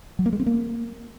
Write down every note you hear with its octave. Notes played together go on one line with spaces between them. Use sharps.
F#3
A#3
G#3
C4
A#3